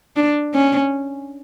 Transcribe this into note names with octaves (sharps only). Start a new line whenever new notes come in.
D4
C#4